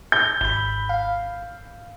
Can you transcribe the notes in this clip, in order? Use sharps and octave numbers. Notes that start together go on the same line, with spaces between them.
G6
G#1 B5 G7
F5